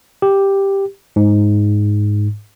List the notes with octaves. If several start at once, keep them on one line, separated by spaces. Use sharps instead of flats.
G4
G#2